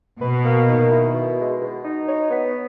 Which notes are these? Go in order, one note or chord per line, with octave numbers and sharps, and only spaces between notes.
B2 B4
A#3
D#3
E4
B2
G#3
B2
D#4
C#5
B3